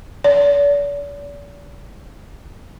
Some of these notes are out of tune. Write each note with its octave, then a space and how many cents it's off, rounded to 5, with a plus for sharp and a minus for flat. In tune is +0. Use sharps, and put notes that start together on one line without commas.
D5 -40